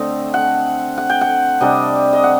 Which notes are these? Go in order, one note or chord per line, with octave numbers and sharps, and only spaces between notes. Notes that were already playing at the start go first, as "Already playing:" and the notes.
Already playing: D3 A3 C4 D#5
F#5
F#5
G5
F#5
C3 G3 D4 D#5
D#5
F#5